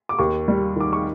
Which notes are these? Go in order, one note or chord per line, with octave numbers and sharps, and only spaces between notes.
D6
D#2 C#6
G3
D#3 D6
C#6